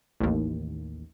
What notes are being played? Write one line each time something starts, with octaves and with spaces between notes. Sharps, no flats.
A1 D#2